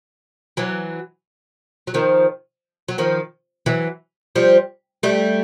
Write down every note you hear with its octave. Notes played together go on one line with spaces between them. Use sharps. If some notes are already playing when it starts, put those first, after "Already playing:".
E3 F#3
F#3
D#3 F3
F#3
D#3 F3
E3 F#3
F3 G3
G3 A3